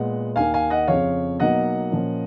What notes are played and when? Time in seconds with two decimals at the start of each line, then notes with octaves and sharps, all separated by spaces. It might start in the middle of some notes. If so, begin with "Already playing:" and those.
Already playing: A#2 G#3 B3 D#5 F#5
0.36 D#2 D#3 A#3 F5 G#5
0.54 F5 G#5
0.70 D#5 F#5
0.87 F2 C#3 F3 C#5 F5
1.40 B2 F#3 A#3 D#4 D#5 F#5
1.92 A#2 F3 A#3 C#4